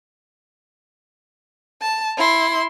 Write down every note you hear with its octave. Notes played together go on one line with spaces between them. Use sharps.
A5
E4 C6